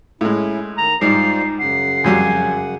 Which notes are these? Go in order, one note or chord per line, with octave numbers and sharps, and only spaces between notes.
A2 G#3 C#4 E4
D#3 A#5
G#2 G3 D#4 F4 C5 D5 C7
F#2 C#3 F#5 C7
F2 F#3 G3 G#5